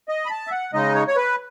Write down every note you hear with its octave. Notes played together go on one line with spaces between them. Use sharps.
D#5
B5
A5
E5
F#5
C#3 G#3 D#4 D#5
C#5
C#5
B4